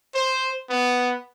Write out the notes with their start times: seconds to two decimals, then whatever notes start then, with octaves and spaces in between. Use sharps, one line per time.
0.15 C5
0.69 B3